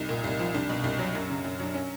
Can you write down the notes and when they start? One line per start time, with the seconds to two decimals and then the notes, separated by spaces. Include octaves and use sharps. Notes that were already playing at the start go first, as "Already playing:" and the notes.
Already playing: C2 D#4
0.09 A#2
0.24 C2
0.39 F3
0.54 C2 D4
0.69 B2
0.84 C2
0.99 F#3
1.15 F#2
1.30 C#3
1.44 F#2
1.60 F#3 D4
1.75 C#4